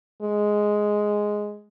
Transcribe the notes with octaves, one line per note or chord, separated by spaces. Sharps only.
G#3